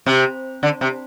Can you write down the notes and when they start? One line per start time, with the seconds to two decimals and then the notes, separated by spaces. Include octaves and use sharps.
0.06 C3
0.63 D3
0.81 C3